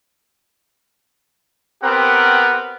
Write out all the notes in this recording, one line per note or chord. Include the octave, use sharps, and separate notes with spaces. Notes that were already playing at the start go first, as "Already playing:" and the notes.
B3 C4 G4 A#4 F#5